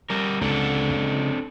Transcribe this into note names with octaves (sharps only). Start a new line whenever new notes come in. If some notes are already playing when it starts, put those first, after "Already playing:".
G3 A#4
C#2 D3 C4 D4 A4
C#2